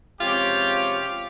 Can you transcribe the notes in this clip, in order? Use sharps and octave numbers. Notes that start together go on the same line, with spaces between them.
C3 F3 G#3 C#4 F4 G4